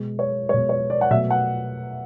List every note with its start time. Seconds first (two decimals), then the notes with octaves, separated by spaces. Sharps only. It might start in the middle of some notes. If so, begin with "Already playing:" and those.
Already playing: B2 G#3
0.19 C#5
0.49 G#3 C#5
0.54 B2
0.69 C#5
0.90 D5
1.01 F#5
1.10 B2 F#3 A3 E5
1.30 F#5